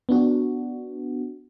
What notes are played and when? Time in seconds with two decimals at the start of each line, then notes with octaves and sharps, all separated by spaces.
0.09 B3 D4 F#4